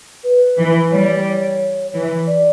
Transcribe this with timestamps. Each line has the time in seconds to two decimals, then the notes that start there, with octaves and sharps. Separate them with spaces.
0.24 B4
0.58 E3
0.92 G3 C#5
1.94 E3
2.27 D5